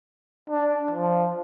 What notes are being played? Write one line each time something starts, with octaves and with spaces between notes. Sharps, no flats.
D4
F3